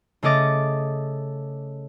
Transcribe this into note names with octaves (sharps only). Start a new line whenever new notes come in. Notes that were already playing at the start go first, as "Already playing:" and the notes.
C#3 A3 C#4 D#5 D6 A6